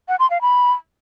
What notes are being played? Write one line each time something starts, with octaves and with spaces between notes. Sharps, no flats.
F#5
C6
F5
B5